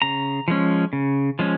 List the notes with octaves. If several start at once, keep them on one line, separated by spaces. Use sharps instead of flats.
C#3 A#5
F3 G#3 C#4
C#3
F3 G#3 C#4